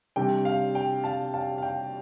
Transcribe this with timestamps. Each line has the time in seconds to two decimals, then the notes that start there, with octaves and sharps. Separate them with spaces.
0.16 C3 G3 D4 G5
0.45 F5
0.75 G5
1.04 F5 A5
1.34 F5 A5
1.58 F5
1.63 G5